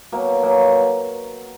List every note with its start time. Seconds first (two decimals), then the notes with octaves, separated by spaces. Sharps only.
0.12 B2 F#3 A#3
0.43 B2 F#3 A#3